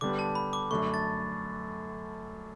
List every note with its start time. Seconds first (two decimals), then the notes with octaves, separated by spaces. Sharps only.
0.01 D3 G3 B3 D6
0.19 A5
0.35 B5
0.53 D6
0.71 F#2 D3 A3 C#6
0.94 A6